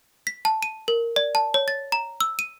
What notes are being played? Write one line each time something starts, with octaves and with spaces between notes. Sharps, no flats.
B6
A5
D#7
A#4
D5
A5
C#5
A6
A#5
E6
D#7